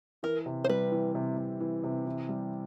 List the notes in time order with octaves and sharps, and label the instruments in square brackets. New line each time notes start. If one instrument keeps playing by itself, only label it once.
[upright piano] E3 [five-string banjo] A#4
[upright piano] C3
[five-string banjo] C5
[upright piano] G3 [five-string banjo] B4
[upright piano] E3
C3
C3
E3
C3
E3
G3